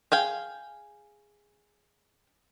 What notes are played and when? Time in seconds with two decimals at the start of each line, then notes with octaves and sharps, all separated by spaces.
0.12 G#4 F5 G5